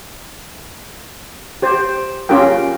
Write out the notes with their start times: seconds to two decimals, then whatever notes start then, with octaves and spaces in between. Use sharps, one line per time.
1.62 G4 C5
2.29 C#4 F4 G4 A#4 G5